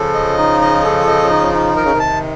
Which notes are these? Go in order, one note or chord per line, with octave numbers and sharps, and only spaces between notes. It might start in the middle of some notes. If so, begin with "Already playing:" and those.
Already playing: C#3 F3 A4
D#5
D#4
D#5
A4
D#5
D#4
D#4
D#3 A#4
C#3
C3 D#3
A5